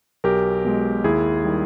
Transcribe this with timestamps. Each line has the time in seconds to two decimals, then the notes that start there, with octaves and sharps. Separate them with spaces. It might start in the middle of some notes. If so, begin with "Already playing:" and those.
0.24 B1 G4 A#4
0.65 B2 G#3
1.04 D#2 E4 G#4
1.44 D#3 G3